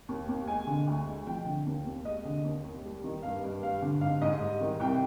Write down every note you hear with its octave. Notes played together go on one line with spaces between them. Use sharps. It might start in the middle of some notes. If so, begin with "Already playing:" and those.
D#2
D#2
G#3 G#5
D3
D2
G#3
F3 G5
D3
D#2
D#2
G#3 D#5
D3
D#2
D#2
G3
D#3
G2 F5
G2
G3 F5
D3
G#2 F5
G#2 D#5
G3
D#3
C2 G5